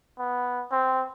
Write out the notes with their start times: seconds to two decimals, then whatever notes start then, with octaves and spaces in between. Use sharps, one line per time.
0.18 B3
0.72 C4